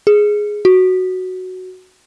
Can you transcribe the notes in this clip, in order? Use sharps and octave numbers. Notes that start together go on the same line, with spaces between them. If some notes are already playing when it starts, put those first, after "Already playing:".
G#4
F#4